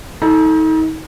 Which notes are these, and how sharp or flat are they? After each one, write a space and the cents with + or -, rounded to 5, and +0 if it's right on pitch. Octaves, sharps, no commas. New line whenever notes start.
D#4 +35 A4 +0